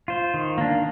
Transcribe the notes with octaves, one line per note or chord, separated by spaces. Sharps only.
F4 C5
D#3
A#3 D4